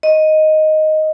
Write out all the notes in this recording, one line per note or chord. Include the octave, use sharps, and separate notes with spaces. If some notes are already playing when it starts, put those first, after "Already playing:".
D#5